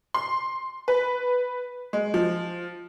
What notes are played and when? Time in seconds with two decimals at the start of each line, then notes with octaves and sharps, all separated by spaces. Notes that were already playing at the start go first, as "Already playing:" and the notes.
0.14 C6
0.88 B4
1.93 G#3
2.14 F3